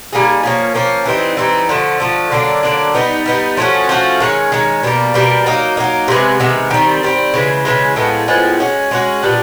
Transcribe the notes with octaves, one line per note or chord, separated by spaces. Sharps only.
G3 A#3 D#4 G#4
F3 A#3 C#4
F3 A#3 C#4
E3 G3 C4 D#4
E3 G3 C4 D#4
D3 F3 A3
D3 F3 A3
D3 F#3 A#3 D4
D3 F#3 A#3 D4
G3 B3 D#4
G3 B3 D#4
F3 A3 C#4 F#4
F3 A3 C#4 F#4
D#3 G#3 C#4
D#3 G#3 C#4
B2 G3 A#3
B2 G3 A#3
F#3 A#3 D#4
F#3 A#3 D#4
C3 D#3 G#3 B3
C3 D#3 G#3 B3
D#3 G3 C4
D#3 G3 C4
C#3 E3 G#3
C#3 E3 G#3
A2 F3 G#3 B3
A2 F3 G#3 B3
G#3 C#4 F#4
G#3 C#4 F#4
A#2 G3 B3 D4